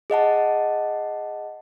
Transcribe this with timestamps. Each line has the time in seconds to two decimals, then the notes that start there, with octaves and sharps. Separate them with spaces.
0.10 G#4 D#5 F#5 A5